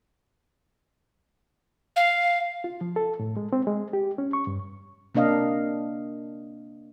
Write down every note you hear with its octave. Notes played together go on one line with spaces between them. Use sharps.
F5
F4
F3
A4
A2
G#3
C4
G#3
G4
C#4
C#6
G2
C3 A#3 D4 D#5 F5